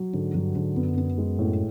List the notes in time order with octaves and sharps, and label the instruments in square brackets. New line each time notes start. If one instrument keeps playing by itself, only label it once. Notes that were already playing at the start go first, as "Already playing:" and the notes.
Already playing: [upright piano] F#3
[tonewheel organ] G#2 [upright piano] D3
[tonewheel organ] G2 [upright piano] F#3
[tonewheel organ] G#2 [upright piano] D3
[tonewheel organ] F#2 [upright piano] B3
[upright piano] B3
G#3
A2